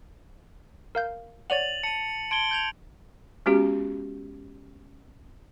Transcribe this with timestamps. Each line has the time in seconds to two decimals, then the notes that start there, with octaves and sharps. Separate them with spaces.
0.95 A#4 F5 G6
1.50 C#5 D5 F#5 A6 D#7 F7 F#7
1.83 A5 C#7 D#7
2.31 A5 C6 G#6 D7 G7
2.51 G6 G#6 F7
3.46 G#3 B3 C#4 F#4 G4